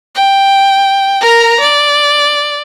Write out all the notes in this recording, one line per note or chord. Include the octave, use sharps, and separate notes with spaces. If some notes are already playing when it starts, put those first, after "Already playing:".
G5
A#4 A#5
D5